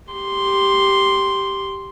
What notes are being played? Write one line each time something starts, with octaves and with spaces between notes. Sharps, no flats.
G4 C6